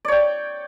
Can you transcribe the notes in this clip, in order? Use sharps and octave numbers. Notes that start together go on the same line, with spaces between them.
C#5 D5 G5